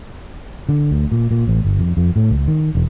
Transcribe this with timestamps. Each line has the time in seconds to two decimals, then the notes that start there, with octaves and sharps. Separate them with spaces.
0.69 D3
0.91 D2
1.12 A#2
1.31 A#2
1.47 A1
1.64 G1
1.80 F2
1.97 F2
2.16 A2
2.30 C#2
2.48 D#3
2.75 E1